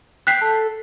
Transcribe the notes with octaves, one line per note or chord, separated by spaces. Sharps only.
G5 F#6 B6 C7
A4